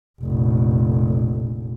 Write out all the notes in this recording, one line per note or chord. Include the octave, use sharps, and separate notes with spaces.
F1 A#1